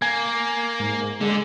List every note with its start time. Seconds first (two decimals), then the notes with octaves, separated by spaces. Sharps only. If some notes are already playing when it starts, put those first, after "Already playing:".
0.02 A#3 G#5 G#6
0.80 G#2
1.21 D3 G#3